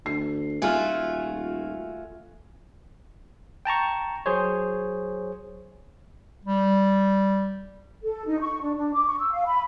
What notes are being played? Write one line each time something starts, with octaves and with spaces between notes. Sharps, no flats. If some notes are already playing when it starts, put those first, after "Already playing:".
D2 C7
D#1 A3 F4 F#4 G#5 F6
G5 A5 A#5 C#6
F#3 G#4 C5 C#5
G3
A4
D#4
C#6
D4
D4
D6
C#6
E6
F5
B5